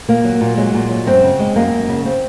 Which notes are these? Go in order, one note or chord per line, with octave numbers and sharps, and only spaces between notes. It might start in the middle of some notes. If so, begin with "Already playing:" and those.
A#2 A#3
F#3
A#2
F#3 G#3
A#2
F#3
F#2 C4
C#3
G#3
F#2 A#3
F#2
C#3
C4